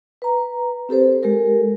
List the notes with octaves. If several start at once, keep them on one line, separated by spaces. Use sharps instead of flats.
B4 A#5
C4 G4 A4 C5
G#3 G4 A4 A#4